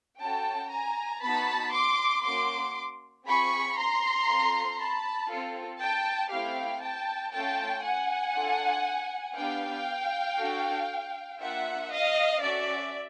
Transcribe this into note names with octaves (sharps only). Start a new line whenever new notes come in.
C#4 F#4 A4 G5 A5
G#5 A#5
B3 D#4 F#4 A5 B5
C6 D6
A#3 C#4 F#4 C6 D6
C4 F4 G#4 B5 C#6
A#5 C6
C4 F4 A4
A5 B5
C4 F4 A4
G5 A5
A3 C4 E4 G4 F5 G5
G5 A5
A3 C#4 F4 A4 G5 A5
F#5 G#5
D4 F4 A4
B3 D4 G4 F5 G5
D4 F#4 A4
A#3 D4 F4 E5 F#5
D#5 F5
C#4 F#4 A4 D5 E5